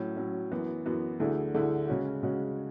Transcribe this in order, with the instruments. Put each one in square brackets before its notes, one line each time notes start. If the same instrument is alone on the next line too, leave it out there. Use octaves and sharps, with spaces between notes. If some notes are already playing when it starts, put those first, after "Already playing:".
Already playing: [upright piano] A2 F#3 C#4
A2 F#3 C#4
F#2 E3 B3
F#2 E3 B3
D2 D3 A3 E4 G#4
D2 D3 A3 E4 G#4
C#3 G#3 C#4 F#4
C#3 G#3 C#4 F#4